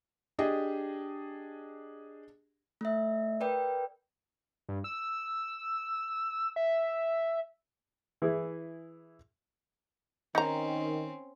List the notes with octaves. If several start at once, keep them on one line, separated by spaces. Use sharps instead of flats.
D4 G4 G#4 D#5
A3 E5
A#4 B4 D5 G5
G2
E6
E5
E3 E4 G#4
D#3 C4 C#4 D#4 A#5